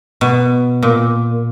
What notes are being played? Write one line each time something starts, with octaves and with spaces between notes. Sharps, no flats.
B2
A#2